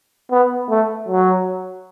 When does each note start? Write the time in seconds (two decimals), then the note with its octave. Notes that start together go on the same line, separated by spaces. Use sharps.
0.31 B3
0.70 A3
1.09 F#3